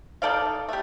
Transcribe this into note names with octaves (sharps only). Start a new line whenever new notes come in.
D#4 A4 D5 F5
A3 G4